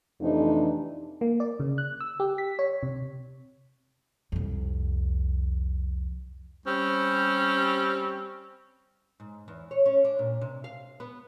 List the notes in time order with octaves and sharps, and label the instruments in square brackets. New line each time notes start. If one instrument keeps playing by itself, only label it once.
[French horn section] F2 C3 E3 A3 D4 D#4
[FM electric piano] A#3
D5
C#3
F#6
E6
G4
B6
C#5
C3
[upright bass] C2 F2
[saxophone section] G3 C4 C#4
[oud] G#2
E2
C#5
C#4
D4
A#2
C3
F5
B3